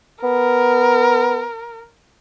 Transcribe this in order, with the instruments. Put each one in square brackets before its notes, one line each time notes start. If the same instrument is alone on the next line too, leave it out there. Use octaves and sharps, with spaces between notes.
[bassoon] B3 [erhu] A#4